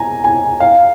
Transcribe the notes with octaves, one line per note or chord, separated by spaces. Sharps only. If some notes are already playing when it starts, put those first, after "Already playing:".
Already playing: G#5 A#5
G#5
F5